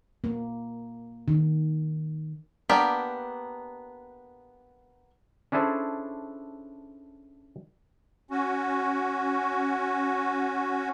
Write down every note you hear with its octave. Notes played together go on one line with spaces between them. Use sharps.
A#3
D#3
A#3 B3 D4 G4 A#4
C#4 D4 E4 G#4 A4 C5
C#4 F#4